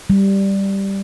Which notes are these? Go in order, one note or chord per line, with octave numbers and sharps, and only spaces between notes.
G3